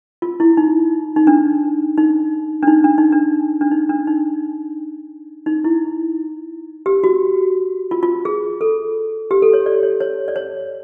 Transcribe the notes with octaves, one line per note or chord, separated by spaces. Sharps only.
F4
E4
D#4
D#4
D4
D#4
D4
D#4
D4
D#4
D4
D4
D#4
D4
D#4
D#4
E4
G4
F#4
F4
F4
G#4
A4
G4
A4
C#5
D5
C#5
C#5
D5
C#5